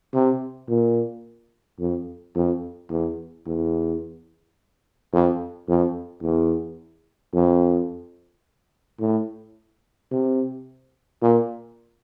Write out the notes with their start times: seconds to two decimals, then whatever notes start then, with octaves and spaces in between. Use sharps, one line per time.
0.14 C3
0.69 A#2
1.79 F2
2.35 F2
2.90 E2
3.47 E2
5.13 F2
5.68 F2
6.23 E2
7.34 F2
9.00 A2
10.11 C3
11.22 A#2